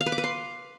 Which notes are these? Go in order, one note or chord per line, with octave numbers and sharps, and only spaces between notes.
F5
B4
D6
B4
C6